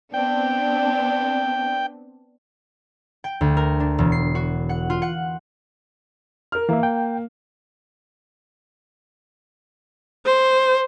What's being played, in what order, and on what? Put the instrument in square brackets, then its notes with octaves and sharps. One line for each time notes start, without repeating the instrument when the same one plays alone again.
[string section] B3 C4 D4 [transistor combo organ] G5
[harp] G5
D2
A#4
D4
E1
C7
F#4
F#5
F4
F#5
[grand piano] A#4 F6
[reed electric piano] E3 A#4 E5 [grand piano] A#3
[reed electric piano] G5
[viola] C5